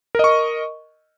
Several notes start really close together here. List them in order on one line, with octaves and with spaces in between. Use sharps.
A#4 D#5 C#6